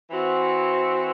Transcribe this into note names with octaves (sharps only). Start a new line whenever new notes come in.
E3 C4 F#4